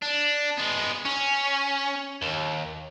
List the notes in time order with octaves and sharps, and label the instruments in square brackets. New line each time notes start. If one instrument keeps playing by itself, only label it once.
[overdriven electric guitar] D4
G#3 B3
C#4
D#2